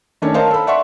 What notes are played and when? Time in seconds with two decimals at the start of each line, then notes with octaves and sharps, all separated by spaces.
0.22 D#3 A3 C#4 D4 C#5
0.34 A#4 C5 C#5 D#5 F5 A5
0.51 A4 B5
0.67 D5 E5 F#5 C6 C#6